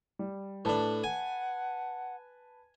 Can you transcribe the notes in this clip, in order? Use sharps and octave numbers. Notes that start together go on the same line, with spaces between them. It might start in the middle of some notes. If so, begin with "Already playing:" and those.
G3
A2 D4 B4 A5
F#5 G#5